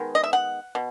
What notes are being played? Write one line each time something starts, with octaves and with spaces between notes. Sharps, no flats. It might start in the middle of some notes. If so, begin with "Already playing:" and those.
Already playing: D#3 G#3 B3
D#5
E5
F#5
B2